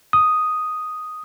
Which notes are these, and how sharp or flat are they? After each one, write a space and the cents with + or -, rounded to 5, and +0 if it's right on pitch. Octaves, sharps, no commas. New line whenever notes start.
D#6 +0